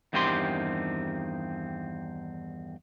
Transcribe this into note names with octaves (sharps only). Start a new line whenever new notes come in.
E2 G2 D#3 C4 G4 C6